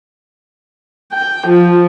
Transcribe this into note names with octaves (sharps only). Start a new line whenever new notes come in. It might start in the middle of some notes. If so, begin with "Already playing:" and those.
G5
F3